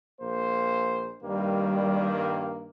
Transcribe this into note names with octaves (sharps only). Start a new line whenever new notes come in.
A#1 A#3 C5
G2 D#3 G3 A#3